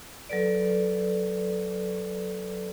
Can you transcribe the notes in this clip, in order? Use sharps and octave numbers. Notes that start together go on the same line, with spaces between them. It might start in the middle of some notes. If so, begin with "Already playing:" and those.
F#3 A4 B4 D5